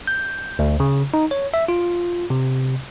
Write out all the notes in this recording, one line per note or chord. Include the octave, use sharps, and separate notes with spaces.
G6
D2
C#3
D#4
C#5
E5
F4
C3